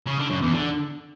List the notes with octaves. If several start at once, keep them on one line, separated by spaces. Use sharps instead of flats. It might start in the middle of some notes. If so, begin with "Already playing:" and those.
C#3
D3
F#2
E2
D3